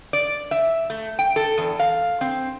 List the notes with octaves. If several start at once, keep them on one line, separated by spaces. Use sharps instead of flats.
D5
E5
A3
G5
A4
E2
F5
C4